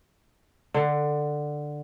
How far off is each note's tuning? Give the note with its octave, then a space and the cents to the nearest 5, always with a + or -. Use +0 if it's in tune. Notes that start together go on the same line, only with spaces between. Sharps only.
D3 +10